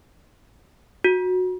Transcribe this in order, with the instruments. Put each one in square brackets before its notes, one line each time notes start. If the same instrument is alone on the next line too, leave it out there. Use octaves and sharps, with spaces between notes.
[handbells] F#4